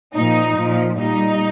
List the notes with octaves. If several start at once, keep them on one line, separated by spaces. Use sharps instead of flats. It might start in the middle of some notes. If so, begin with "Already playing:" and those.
A#2 F3 D#4
A#2 F3
A#2 G3 D#4